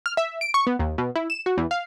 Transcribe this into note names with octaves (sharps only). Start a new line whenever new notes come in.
F6
E5
D7
C#6
B3
D#2
B2
E4
E7
F#4
E2
F5